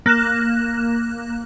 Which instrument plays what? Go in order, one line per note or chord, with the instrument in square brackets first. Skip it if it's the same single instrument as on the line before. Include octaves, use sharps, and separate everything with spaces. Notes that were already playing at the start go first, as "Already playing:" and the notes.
[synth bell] A#3 F#6 E7